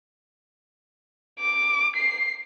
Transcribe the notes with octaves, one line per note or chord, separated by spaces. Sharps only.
D6
C7